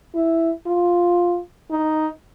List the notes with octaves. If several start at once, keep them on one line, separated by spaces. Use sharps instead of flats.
E4
F4
D#4